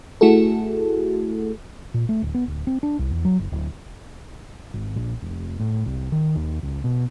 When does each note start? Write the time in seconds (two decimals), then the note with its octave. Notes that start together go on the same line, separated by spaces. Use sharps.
0.21 A3 E4 F#4 G#4 A4
1.94 A#2
2.09 A3
2.22 D1
2.35 B3
2.48 D1
2.67 C4
2.83 D4
2.99 C2
3.11 E2
3.25 F#3
3.39 F#1
3.52 D1
4.74 G#1
4.96 A#1
5.22 F1
5.60 A2
5.86 C2
6.12 D#3
6.36 D#2
6.63 C#2
6.84 B2